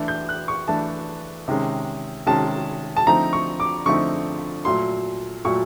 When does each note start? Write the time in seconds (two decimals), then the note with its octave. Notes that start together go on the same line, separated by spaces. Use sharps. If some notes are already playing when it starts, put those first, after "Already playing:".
Already playing: E3 A3 D4
0.08 G6
0.29 F#6
0.48 C#6
0.68 E3 A3 D4 A5
1.48 C3 D#3 G#3 C#4
2.26 C3 D#3 G#3 C#4 A5
2.97 A5
3.07 D3 F3 A3 C4 D#4 A#5
3.33 C#6
3.60 D6
3.86 D3 F3 A3 C4 D#4 C#6
4.65 A#2 F#3 A3 C6
5.45 A#2 F#3 A3 C#6